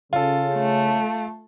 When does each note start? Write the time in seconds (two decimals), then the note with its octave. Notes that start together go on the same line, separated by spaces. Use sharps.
0.13 C#3 F4 A4
0.55 A3